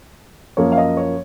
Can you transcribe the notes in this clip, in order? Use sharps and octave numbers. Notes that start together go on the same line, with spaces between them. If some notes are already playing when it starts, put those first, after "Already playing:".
F#2 F3 A#3 C#5
F5
D#5
C#5